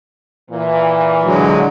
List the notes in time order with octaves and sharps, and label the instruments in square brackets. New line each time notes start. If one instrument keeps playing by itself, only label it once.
[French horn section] A#2 E3
[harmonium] D3 F#3 G#3